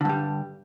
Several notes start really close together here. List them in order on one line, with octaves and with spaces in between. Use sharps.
D3 G2 G3